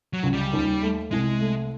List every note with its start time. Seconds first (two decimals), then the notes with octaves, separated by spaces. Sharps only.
0.13 F#3
0.23 C#2
0.33 G3
0.53 D#2
0.82 A3
1.11 C2 G#3
1.40 A3